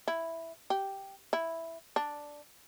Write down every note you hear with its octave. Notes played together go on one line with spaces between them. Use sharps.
E4
G4
E4
D4